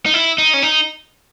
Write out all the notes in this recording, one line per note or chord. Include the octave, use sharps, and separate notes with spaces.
D#4
E4
D#4
C#4
D#4